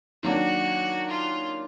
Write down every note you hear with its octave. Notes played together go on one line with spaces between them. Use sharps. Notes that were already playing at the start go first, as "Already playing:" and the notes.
D#3 F#3 A#3 D4 F#4
F4